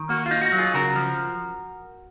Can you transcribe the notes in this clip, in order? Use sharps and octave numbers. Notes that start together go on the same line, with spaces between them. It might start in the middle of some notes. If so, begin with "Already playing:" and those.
Already playing: D#3
A#3 F#4
F4
D#4
F#4
F#3
F4 G#4
C#3 F#4 A#4
F3